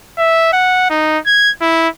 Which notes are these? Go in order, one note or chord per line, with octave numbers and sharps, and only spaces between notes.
E5
F#5
D#4
G#6
E4